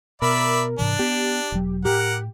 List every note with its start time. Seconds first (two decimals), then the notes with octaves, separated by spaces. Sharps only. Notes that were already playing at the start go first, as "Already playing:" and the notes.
0.22 B2 A#4 D5 E5 B5
0.79 G#2 C3 E3 D4
0.99 B3 G4
1.52 E1 F#3
1.85 A2 G4 A#4 F#5